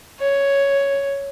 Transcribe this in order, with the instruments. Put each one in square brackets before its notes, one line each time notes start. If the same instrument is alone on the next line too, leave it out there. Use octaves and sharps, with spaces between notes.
[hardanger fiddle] C#5